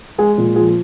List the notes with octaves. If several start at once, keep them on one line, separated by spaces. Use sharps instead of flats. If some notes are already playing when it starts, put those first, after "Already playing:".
G#3 G#4
A#2
F3 G#4